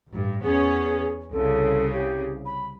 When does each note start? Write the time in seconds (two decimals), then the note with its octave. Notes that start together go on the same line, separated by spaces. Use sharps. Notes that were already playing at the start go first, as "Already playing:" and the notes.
0.12 A1 G2
0.43 E2 B3 C#4 G#4
1.32 C2 C#3 A4
1.92 G4
2.45 B5